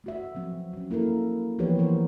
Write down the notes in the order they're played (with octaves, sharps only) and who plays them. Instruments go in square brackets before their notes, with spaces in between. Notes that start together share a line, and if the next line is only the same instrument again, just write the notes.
[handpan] A3 F#4 E5
F3 F#3 C4
F#3 C#4
A#3 E4 A4 A#4
E3 F3 B3 G4 B4 C#5
F3 F#3 A#3 C4 A#4 C5